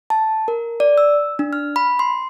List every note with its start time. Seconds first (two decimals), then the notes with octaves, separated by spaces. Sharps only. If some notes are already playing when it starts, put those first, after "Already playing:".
0.10 A5
0.48 A#4
0.80 D5
0.98 E6
1.39 D4
1.53 F6
1.76 B5
1.99 C6